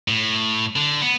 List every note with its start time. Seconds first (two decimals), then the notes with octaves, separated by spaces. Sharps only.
0.08 A2
0.76 D3
1.02 B3